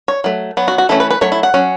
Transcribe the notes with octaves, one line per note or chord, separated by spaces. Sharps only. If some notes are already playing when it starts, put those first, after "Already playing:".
C#5
F#3 A3
F#3 B3
F#4
F#4
E3 A3 C#4 A4
B4
B4
F#3 A3 C#5
E4
F#5
F#3 C#4